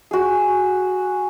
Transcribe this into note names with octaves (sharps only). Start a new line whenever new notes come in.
F#4 G#4